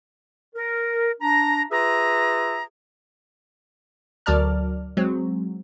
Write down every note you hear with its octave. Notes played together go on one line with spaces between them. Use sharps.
A#4
D4 A#5
F4 G#4 B4 E5 A#5
D2 F#3 A#4 D5 A5 F6
F#3 G#3 C4